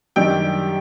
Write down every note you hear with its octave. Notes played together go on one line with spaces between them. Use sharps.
F#2 D#3 G3 D4 G4 G5